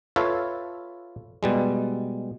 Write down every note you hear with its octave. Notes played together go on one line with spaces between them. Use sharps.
F4 A4 B4 C#5 E5 F5
B2 G3 G#3